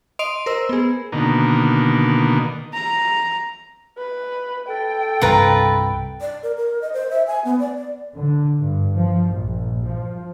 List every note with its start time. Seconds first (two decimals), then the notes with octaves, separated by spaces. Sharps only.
0.19 D#5 C6 D#6 D7 F7
0.46 A#4 C5 E6
0.69 B3 G#4
1.12 B2 D3 D#3 A#3
2.73 A#5
3.98 B4
4.69 A4 G5
5.21 C2 G2 C3 F4 B4 A#5
6.21 D5
6.43 A#4
6.57 A#4
6.82 D#5
6.93 C5
7.11 E5
7.27 G#5
7.45 B3
7.59 D5
7.77 D5
8.15 D3
8.60 G2
8.95 F3
9.32 A#1
9.85 F3